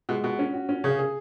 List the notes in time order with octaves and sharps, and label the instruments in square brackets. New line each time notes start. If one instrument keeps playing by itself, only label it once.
[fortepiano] B2 [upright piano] G#3
[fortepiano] B2 [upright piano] F#4
[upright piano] C#4
F#4
C#4
[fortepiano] C#3 [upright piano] G#4
[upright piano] G#4